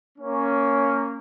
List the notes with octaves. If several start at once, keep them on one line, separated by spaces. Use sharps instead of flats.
A#3 C#4